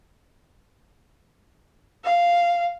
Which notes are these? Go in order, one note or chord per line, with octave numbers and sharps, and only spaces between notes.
F5